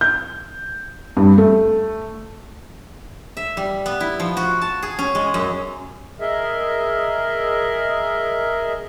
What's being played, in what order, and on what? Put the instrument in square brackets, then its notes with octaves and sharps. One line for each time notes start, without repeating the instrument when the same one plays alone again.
[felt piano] G6
G2
A3
[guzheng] E5
G3
B3
E4
F3
F#4
A5
G#4
C#4
G#3
F#2
[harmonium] G#4 A#4 D#5 E5